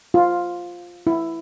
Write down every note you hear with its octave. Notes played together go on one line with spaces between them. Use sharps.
F4
E4